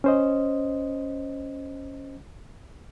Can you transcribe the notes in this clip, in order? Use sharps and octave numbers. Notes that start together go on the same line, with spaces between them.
C#4 C5 D#5